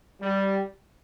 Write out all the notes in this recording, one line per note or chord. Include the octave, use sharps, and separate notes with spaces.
G3